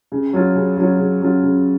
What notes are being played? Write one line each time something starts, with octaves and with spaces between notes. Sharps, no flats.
C#3
F#3 C#4 F4
C#3
F#3 C#4 F4
C#3
F#3 C#4 F4
C#3